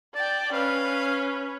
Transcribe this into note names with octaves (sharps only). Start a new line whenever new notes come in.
D5 G5 A5
C#4 B4 F5